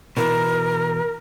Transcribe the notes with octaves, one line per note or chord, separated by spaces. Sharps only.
B2 E3 A#4